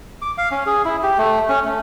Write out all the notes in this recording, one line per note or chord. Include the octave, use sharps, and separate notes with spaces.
D6
F5
C#4
G#4
E4
G4
A3
C#4
A3